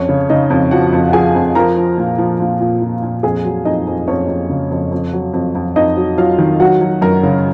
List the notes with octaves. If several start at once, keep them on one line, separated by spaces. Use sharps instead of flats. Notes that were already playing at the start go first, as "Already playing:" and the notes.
Already playing: F2 C#4 C#5
C#3
C#3 D#4 D#5
F2
F3 F#4 F#5
F2
F#5
F3 G#4 G#5
F2
F3 A#4 A#5
F3
A#2
F3
A#2
A#2
F3
A#2
F2 G#4 G#5
F#3
F2 D#4 D#5
F2
F2 C#4 C#5
F2
C#3
F2
F2
F#3
F2
F2
F2 D#4 D#5
F#3
F#3 F4 F5
D#3
F#3 F#4 F#5
F#3
F#2 A#4 A#5
C#3